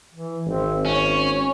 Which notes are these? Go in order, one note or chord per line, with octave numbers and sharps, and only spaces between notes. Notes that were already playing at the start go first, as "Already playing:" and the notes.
E3
G#1 C4
C#4 C#5